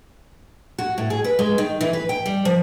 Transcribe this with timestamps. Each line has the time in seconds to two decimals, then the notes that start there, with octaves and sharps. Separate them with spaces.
0.78 F#4
0.98 A2
1.10 G#4
1.24 B4
1.39 G#3
1.58 D#3
1.81 E3
1.93 B4
2.09 G5
2.26 G3
2.45 F3